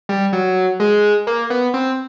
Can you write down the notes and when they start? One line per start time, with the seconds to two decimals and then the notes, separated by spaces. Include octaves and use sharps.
0.09 G3
0.33 F#3
0.80 G#3
1.27 A#3
1.50 B3
1.74 C4